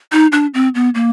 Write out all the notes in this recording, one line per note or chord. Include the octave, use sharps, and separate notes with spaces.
D#4
D4
C4
B3
A#3